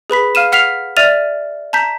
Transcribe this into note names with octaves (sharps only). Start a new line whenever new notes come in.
G#4 B4 B5 B6
F5 F6 D#7 E7
F#5 F6 B6 C7 F7
D5 E5 F6 A6 D#7 F7
A5 A#5 G6 B6